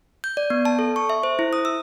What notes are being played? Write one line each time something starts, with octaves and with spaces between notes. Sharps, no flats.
G6
D5
B3
A5
A4
C#6
E5
C5
E4
D#6
E6